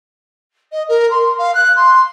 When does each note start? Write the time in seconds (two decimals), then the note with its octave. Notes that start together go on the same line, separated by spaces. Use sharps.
0.71 D#5
0.88 A#4
1.10 C6
1.38 F5
1.54 F#6
1.76 C6